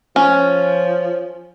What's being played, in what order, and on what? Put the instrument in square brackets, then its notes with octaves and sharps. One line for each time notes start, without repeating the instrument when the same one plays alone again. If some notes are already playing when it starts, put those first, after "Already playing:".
[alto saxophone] F3 [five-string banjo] C#4